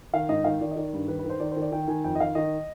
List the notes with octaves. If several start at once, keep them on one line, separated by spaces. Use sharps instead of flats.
D#3 F5
G#2 D#5
D#3 F5
D#3 D5
D#5
D#3 D5
G2
D#3 B4
B4
D#3
C5
D#3 D5
D#3 C5
D5
D#3 G5
D#3 G#5
F2 G5
D#5
D#3 F5
D#3 D#5